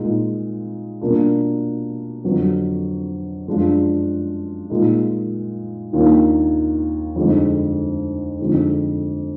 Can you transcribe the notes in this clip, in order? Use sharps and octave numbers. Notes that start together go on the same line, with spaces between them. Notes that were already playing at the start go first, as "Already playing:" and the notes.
Already playing: A#2 G#3 D#4
B2 A#3 D4 F4
F2 D3 F#3 B3
F#2 F3 G#3 D4 F4
A#2 G#3 D#4
D#2 D#3 A#3 D4 F4
F2 D3 G#3 D#4
F2 D3 G#3 D#4